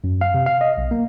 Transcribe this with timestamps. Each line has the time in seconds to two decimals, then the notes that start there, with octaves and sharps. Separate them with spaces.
0.04 F#2
0.21 F5
0.34 C3
0.46 F5
0.61 D#5
0.78 B1
0.91 A#3